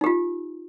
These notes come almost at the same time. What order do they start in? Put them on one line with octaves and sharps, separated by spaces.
D#4 G4 F4